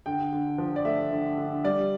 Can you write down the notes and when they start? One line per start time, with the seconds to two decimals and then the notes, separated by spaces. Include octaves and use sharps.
0.06 D3 G5
0.32 D3
0.58 F3
0.76 D5
0.85 A3 E5
1.11 D3
1.38 D3
1.64 G3 D5